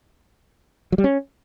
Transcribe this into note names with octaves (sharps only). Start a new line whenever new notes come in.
F#3
G3
C#4